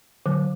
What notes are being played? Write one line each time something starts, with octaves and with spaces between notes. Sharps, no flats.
D3 F#3